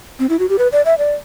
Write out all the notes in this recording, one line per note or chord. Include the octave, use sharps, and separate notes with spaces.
C4
E4
F#4
G4
B4
D5
E5
D5